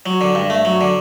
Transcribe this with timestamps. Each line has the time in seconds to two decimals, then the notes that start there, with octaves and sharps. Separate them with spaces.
0.06 F#3
0.21 D3
0.35 G2
0.50 A3
0.65 F#3
0.81 D3